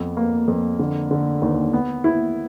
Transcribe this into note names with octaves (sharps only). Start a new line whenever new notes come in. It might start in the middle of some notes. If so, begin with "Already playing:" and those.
Already playing: F2 B3
A#3
F2
D3
D3
D#2
B3
E4